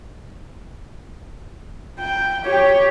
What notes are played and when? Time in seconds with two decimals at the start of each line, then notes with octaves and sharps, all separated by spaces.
2.00 G5
2.45 G4 C#5